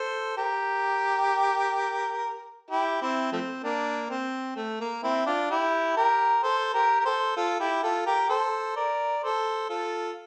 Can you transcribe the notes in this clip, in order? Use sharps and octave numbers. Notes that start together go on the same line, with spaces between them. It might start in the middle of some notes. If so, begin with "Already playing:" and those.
Already playing: A4 C5
G4 A#4
E4 G4
C4 E4
F3 A3 C4
A#3 D4
C4
A3
A#3
C4 E4
D4 F4
E4 G4
G4 A#4
A4 C5
G4 A#4
A#4
A4 C5
F4 A4
E4 G4
F4 A4
G4 A#4
A4 C5
A#4 D5
A4 C5
F4 A4